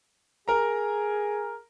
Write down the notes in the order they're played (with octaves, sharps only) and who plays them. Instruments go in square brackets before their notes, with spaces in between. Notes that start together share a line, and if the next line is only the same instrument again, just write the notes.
[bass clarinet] G#4 [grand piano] A#4 A#5